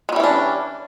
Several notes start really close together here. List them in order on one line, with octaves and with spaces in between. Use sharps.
G#3 G3 E3 C#4 D4